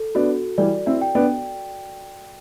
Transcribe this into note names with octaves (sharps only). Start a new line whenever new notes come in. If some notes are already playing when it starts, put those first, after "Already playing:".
Already playing: A4
B3 D4 F#4
E3 G3 D5
C4 E4
G5
B3 D4